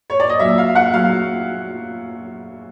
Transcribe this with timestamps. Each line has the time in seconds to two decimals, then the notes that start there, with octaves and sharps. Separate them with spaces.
0.10 C#5
0.20 D5
0.30 D#5
0.39 A#2 F#3 E5
0.58 F5
0.75 F#5
0.93 A#2 F#3 F5